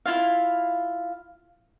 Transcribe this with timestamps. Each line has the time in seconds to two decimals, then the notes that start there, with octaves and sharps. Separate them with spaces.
0.06 E4 F4 F5